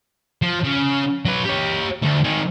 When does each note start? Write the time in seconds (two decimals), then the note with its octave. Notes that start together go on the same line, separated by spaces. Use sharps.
0.42 F3
0.64 C#3
1.25 F#3 B4
1.45 G4 C#5
2.03 D2 A3
2.24 D#3 G#4